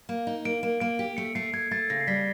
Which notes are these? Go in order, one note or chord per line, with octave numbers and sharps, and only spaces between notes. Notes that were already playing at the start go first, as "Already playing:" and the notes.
A#3
D#4
A#3 D7
A#3
A#3 D7
G4
A3 C#7
A3 C7
A3 G#6
A3 A6
C#3 A#6
C7
G3 B6